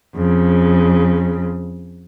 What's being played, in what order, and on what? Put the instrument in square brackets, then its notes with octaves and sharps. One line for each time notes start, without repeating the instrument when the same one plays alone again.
[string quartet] F2 C#3